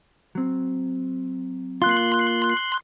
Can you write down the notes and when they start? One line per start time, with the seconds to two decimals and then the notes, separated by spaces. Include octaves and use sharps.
0.35 F#3 C4
1.82 A#3 F4 C6 F#6